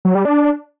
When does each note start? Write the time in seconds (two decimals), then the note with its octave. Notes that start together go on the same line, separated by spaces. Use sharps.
0.05 F#3
0.15 G3
0.25 D4